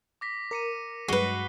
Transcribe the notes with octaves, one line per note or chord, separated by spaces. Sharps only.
D6 A#6 B6
A#4 D6 C#7 D#7
G2 F#3 G#3 F#4 B4 C7 D#7 G7